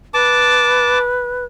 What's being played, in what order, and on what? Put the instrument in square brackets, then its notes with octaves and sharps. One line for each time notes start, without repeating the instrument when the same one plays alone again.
[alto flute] B4 [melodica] A5 D6